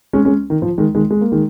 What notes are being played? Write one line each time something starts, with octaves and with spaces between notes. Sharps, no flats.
G#3 C#4
G#3 C#4
D#3
F3
D#3 G#3
D#3 G#3
G#3
A#3
D#3 G#3